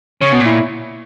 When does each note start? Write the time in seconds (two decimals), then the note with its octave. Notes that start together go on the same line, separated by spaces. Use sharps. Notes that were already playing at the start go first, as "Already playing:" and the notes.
0.21 C#3 C#4
0.32 B2
0.40 A#2
0.45 E4